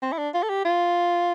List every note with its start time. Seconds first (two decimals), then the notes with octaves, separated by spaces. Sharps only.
0.02 C4
0.12 E4
0.18 D4
0.34 F4
0.43 A4
0.49 G4
0.65 F4